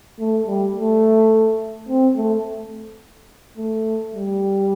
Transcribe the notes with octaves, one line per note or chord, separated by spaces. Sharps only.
A3
G3
A3
C4
A3
A3
G3